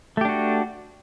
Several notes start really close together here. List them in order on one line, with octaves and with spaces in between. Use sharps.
A3 G4 D4 F#4